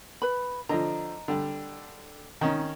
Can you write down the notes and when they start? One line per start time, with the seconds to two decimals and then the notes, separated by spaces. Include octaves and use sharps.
0.22 B4 B5
0.69 D3 F3 D#5 A#5
1.28 D3 G3
2.41 D#3 C#4 D#4